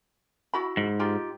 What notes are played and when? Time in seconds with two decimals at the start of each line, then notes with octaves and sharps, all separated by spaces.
0.54 E4 F#4 B5
0.77 G#2
0.99 D#4 F4 G4